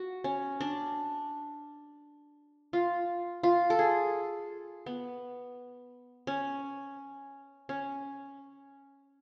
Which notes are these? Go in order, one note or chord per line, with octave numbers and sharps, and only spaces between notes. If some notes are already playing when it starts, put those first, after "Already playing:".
Already playing: F#4
C#4
D4
F4
F4
A4
G#4
B3
C#4
C#4